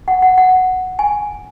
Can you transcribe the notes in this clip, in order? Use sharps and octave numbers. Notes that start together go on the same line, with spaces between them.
F#5
F#5
F#5
G#5